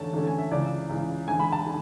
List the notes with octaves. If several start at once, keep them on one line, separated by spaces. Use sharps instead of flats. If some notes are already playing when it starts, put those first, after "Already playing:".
Already playing: E2 D3 A3 C#4 A5
E2 D3 A3 C#4
G#5
E5
C#2 C#3 E3 D5
C#2 C#3 E3
E2 D3 G#3 G#5
B5
A5
D3